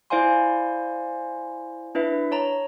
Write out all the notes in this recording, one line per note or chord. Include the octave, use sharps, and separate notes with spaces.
E4 C5 D5 F5 G#5 C6
D4 E4 B4 E5
C#5 A5 A#5